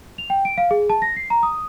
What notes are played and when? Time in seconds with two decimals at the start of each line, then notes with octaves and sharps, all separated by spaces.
0.18 F7
0.30 G5
0.45 D7
0.58 F5
0.71 G#4
0.90 A5
1.02 A#6
1.16 C7
1.30 A#5
1.43 D#6